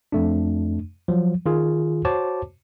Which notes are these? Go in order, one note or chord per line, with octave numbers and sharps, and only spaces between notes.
F2 A3 D4
F3 F#3
D#3 F4 G#4
F#4 C5 C#5 A5 D6